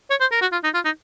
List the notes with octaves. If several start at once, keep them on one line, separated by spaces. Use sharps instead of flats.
C#5
C5
A#4
F#4
F4
D#4
F4
D#4